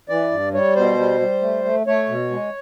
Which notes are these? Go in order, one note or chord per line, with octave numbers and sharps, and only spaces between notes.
E3 D5
G2
G3 C#5
B2 C5
G3
G3
A3
A3
A3 C#5
B2
G#3